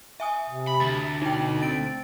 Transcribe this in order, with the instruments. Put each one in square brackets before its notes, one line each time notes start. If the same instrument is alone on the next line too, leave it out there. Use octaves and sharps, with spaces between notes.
[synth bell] E5 G#5 D#6
[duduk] C3
[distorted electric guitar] B5
[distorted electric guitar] D2 [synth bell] A6
[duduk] B2 [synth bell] D#4 G5
[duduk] C4 [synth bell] A6 D7